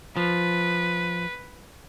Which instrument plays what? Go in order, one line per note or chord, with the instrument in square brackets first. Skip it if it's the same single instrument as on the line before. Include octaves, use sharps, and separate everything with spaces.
[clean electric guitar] F3 [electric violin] B4